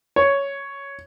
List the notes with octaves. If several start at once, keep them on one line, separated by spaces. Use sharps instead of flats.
C#5